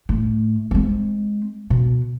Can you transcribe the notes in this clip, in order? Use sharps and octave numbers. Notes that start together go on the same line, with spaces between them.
A2
G#3 C4
B2